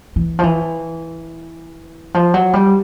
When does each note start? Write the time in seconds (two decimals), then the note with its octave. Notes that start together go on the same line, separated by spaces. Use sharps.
0.16 E3
0.39 F3
0.43 E3
2.14 F3
2.34 F#3
2.53 G3